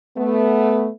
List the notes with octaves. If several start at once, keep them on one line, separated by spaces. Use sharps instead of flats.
A3 B3